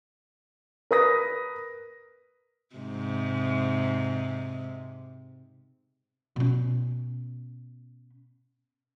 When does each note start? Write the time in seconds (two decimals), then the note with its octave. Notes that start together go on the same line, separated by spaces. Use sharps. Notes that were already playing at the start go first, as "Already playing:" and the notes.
0.91 A#4 B4 D#6 A#6
2.75 G#2 C3
6.36 B2 C#4